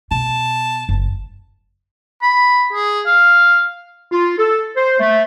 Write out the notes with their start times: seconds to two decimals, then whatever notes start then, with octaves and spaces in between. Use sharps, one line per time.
0.11 B2 A5
0.89 F#1
2.22 B5
2.73 G#4
3.06 F5
4.12 F4
4.39 A4
4.76 C5
5.00 A3